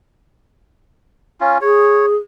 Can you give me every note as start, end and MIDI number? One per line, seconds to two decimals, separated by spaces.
1.41 1.58 61
1.41 1.58 65
1.61 2.16 68
1.61 2.06 73